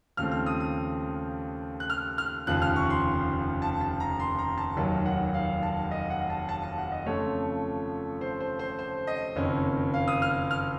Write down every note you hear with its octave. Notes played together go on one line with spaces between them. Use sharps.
D#2 C#3 F3 A3 C4 F6
F6
D#6
D#6
F#6
F6
F6
F1 D#2 C#3 F3 F#6
F6
C#6
C6
A5
A5
A#5
C6
A#5
A5
F1 D#2 D#3 F#3 A5
F#5
F5
A5
D#5
F#5
A5
A5
A5
F#5
D#5
F2 C#3 F3 A3 C#5
C5
C5
C5
C5
D#5
F#1 F2 D#3 A#3 C#4
F5
D#6
F6
F6